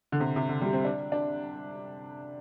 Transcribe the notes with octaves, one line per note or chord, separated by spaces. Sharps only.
D3
C3
C3
D3
G3
C4
D4
D4